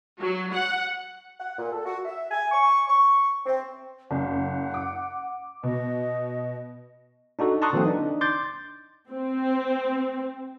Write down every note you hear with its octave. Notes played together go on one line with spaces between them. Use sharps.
F#3
F#5
F#5
A#2
A4
F#4
E5
G#5
C#6
C#6
C4
F#1 F#5
D6
B2 D#5
D4 D#4 F#4 A4
A5 A#5 C6 C#6 D#6 F#6
D3 E3 F#3 A#3 C4
D4 D#4
C6 D6 G6 A6
C4